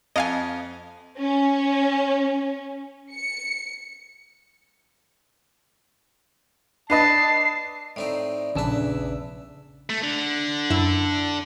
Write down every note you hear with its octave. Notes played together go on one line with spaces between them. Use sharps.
F2 D#5 F5 G#5
C#4
C#7
D4 B4 D#5 A5 C7
A2 C4 D#4 D5
A#1 E2 C#3 D4 B4 E6
A3
D3
F#2 E4 E6